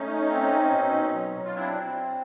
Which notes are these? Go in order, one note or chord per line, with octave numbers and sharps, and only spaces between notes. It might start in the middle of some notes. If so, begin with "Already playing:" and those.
Already playing: A3 C#4 D#4
C4
B2
F#3
F4
C4 D4 E4